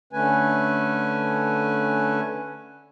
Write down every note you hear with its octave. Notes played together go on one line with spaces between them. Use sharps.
D3 A3 C#4 B4 G#5